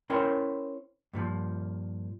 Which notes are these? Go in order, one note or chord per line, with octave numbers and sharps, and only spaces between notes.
C#4 E4 A#4 C5 C#5 G5
G2 A#2 D#3 F3